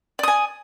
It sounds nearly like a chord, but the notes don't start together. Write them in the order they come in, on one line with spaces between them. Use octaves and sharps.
D5 D#6 G#5